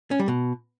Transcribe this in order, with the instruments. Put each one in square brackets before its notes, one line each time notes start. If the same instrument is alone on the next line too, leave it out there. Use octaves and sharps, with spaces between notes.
[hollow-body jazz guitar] C#4
G3
B2